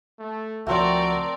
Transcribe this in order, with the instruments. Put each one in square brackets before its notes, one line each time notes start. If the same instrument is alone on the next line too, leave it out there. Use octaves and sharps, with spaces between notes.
[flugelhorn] A3
[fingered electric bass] C#2 F3 [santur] A3 C4 G5 [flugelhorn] F#4 [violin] A#4 D5